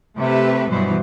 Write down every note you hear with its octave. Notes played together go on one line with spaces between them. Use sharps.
C3 A3 G4 B4 E5
G2 B2 E3 F#3 C5